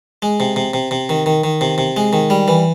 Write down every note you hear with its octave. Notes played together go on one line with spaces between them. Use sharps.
G#3
C3
C3
C3
C3
D#3
D#3
D#3
C3
C3
G#3
D#3
G3
E3